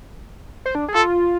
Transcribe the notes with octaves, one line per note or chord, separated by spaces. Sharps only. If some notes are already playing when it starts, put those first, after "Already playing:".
C5
D4
G#4
F4 A4